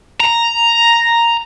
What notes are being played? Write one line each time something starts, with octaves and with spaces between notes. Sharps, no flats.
A#5